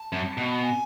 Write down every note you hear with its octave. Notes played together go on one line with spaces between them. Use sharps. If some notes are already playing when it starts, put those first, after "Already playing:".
Already playing: A5
F#2
B2
G#5